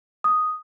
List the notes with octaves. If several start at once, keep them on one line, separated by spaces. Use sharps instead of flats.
D#6